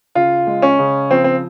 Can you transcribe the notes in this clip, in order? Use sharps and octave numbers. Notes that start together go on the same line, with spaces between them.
C#3 F4
G#3
C#4
C#3
F3 C4
C4